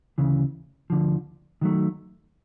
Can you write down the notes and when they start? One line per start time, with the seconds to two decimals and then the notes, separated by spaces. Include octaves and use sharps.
0.18 D2 C#3 E3
0.90 D2 D3 F3
1.61 D#3 F#3 A3